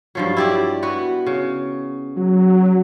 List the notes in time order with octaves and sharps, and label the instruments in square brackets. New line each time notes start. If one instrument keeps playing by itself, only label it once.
[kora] G2 F3 F#3
E4 G4 D5
B3 F#4
C#3
[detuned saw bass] F#3